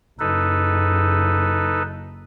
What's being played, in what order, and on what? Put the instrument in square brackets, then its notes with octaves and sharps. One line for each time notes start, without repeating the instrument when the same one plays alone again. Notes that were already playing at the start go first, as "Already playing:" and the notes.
[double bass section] F#1 [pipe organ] D#4 A4 B4